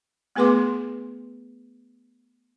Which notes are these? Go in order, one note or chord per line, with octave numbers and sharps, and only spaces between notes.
A3 B3 G#4 B4 C6 D6